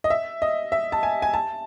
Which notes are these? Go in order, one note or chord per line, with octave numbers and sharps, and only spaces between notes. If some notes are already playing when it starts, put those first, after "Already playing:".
D#5
E5
D#5
E5
A5
G#5
G#5
A5